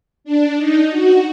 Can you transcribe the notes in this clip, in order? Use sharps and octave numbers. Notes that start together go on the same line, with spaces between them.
D4
D#4
F#4